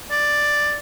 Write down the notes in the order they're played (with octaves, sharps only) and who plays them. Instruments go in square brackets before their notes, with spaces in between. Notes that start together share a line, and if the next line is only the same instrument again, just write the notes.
[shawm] D5